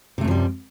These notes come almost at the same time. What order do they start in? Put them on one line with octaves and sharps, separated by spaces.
C3 A3 F#2 F3 G3